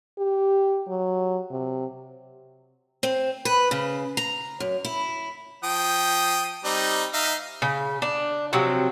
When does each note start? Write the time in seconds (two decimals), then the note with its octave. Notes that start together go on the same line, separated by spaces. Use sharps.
0.18 G4
0.87 F#3
1.51 C3
3.03 C4
3.45 B4
3.71 C#3
4.17 A#5
4.60 F#2
4.85 E4
5.64 F3 G5 D#6
6.64 G3 C4 D#4
7.13 D#4 E5 F5
7.62 C#3
8.02 D4
8.53 C3 F3 F#3 C4